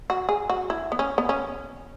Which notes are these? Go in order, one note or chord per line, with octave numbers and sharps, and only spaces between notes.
F#4
G#4
F#4
E4
B3
C#4
B3
C#4